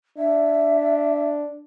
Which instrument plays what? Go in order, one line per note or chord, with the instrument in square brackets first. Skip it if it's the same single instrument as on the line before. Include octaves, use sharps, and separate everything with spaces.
[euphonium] D4 [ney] E5